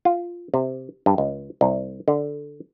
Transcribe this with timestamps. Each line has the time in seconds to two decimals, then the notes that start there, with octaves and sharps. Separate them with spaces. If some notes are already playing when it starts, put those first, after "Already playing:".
0.05 F4
0.54 C3
1.06 G2
1.18 C#2
1.61 C2
2.08 D3